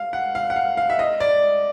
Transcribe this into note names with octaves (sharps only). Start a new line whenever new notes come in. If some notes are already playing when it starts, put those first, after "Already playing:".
Already playing: F5
F#5
F5
F#5
F5
F5
E5
D#5
D5